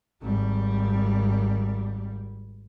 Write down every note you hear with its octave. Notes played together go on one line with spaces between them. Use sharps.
G#1 G3